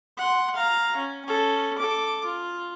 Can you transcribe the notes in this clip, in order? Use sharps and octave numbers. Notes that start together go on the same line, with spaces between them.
F#5 C6
F5 A#5
C#4
C#4 A4
A4 D6
F4